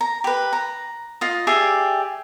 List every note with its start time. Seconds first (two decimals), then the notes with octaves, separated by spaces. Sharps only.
0.01 A#5
0.24 G4 B4
0.53 A#5
1.21 F4 D#5
1.47 G4 G#4 D5 E5